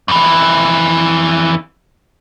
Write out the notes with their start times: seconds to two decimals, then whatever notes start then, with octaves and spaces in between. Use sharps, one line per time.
0.08 F2 E3